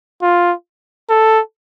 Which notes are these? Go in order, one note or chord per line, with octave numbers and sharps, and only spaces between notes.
F4
A4